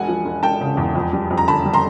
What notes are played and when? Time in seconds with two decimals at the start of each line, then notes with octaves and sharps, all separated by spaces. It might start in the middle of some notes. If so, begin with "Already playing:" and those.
Already playing: E1 F#5 G#5
0.08 F3
0.25 E1
0.43 E1 G5 A5
0.61 C#3
0.77 E2
0.95 F2
1.13 G3
1.31 F2
1.38 A#5
1.47 D3 A5 B5
1.65 G3
1.73 A#5 C6